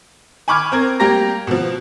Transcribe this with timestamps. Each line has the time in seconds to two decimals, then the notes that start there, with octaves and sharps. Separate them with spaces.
0.48 G#5 B5 C#6 D6 F6 G#6
0.72 C4 A#4 G#6
1.00 G3 A#3 G4 G5 A#5 A#6
1.47 B2 F3